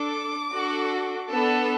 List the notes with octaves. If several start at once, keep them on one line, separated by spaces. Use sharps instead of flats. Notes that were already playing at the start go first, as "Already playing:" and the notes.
Already playing: D4 A4 D6
D4 F#4 A4
B3 D4 A4